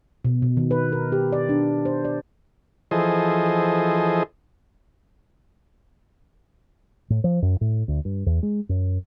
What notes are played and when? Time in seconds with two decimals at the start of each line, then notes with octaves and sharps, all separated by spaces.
0.25 B2
0.42 B2
0.57 D#3
0.71 B4
0.92 A#4
1.12 G4
1.33 D5
1.49 D4
1.85 C5
2.05 D5
2.91 E3 F3 G#4 A4 C5 D#5
7.10 A2
7.24 F3
7.42 F#2
7.61 A2
7.88 D2
8.05 G2
8.26 E2
8.43 G#3
8.69 F#2